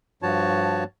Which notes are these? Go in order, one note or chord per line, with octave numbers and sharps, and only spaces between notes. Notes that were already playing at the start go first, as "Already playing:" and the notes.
G2 F3 F#4 C#5 A5